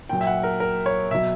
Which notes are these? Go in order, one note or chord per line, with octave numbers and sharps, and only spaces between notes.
A#2 F#3 G5
E5
F#5
A#4
A#4
C#5
B2 F#3 E5